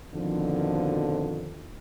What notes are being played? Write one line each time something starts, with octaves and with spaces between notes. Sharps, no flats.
F2 B2 D3 D#3 F3